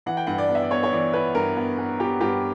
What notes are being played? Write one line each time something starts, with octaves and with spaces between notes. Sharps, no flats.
E3 F#5
G5
G2 F#5
D5
B3
E5
D5
B3 C#5
C#5
E3 D5
B3 B4
G2 A#4
B3
B3
B3 G4
G2 G4